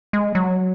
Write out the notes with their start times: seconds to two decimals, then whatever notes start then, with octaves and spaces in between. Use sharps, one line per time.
0.13 G#3
0.35 F#3